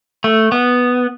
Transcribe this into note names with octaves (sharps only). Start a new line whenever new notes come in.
A3
B3